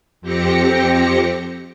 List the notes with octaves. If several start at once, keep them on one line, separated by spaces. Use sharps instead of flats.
F2 C4 G4 A#6 C#7